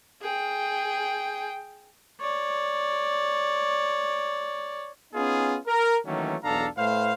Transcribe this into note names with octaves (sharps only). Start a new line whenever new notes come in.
G#4 G5
C#5 D5
B3 C#4 D#4 F4 G#4
A#4
D#3 E3 F#3 A3 A#3 C#4
B1 E2 D4 A4 F5 A#5
A2 A3 B4 C5 F5